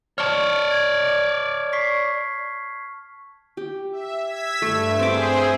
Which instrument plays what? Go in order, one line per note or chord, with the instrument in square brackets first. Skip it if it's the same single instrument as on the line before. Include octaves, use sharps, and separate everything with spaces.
[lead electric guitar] C#5 D5 [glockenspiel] A5 C#6 F6
[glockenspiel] G#6
C#6 B6 C7
[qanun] G4
[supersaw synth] E5
E6 G#6 B6
[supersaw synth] G2 E5 [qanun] A3
[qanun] C4 D6 [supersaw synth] G#4 C5